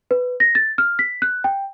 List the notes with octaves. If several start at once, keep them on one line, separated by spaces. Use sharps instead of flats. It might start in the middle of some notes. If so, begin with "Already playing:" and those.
B4
A#6
A6
F6
B6
F#6
G5